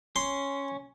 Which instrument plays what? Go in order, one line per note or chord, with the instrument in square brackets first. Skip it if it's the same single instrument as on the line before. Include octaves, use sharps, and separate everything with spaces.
[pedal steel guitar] C#4 [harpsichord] C6